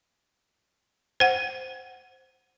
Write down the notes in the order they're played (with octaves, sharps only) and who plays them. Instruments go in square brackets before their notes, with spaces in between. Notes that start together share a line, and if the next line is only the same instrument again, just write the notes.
[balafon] C5 F#5